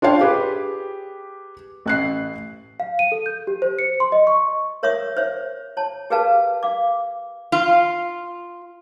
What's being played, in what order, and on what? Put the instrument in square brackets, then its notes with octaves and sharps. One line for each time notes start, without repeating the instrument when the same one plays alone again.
[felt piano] D4 F4 C#5 F5 G5 C6
G4 G#4 B4
A1 F#6 C7
[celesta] F5
D#7
A4
G6
G4
C5
C#7
C6
D#5
C#6
[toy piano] A#4 C#5 E5 C#6 D#6
C5 C#5 E5
C#5 A5
G4 G#4 A#4 B4 F5 A5
F5 D6
[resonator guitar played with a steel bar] F4